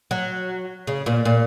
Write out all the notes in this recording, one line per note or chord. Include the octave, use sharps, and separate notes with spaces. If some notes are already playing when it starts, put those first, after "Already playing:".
F#3
C#3
A#2
A#2